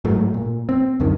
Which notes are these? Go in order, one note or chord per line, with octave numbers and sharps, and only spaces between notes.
G#2 F#3 A3
A#2
C4
C#2 F#2 D3 D#3